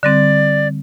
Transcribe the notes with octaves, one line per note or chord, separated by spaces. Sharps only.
D3 G3 C4 D5